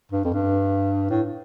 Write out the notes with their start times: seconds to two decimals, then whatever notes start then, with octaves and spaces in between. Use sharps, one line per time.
0.12 G2
0.25 F2
0.34 G2
1.11 A2